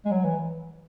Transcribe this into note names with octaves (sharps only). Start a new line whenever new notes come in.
G#3
F#3
E3